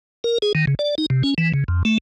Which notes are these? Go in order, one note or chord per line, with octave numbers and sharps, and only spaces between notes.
A#4
G#4
D#3
C#3
D5
D#4
C3
C#4
E3
C#3
F2
A3